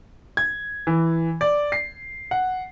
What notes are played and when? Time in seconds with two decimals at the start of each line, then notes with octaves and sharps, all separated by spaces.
0.37 G#6
0.87 E3
1.41 D5
1.72 C7
2.31 F#5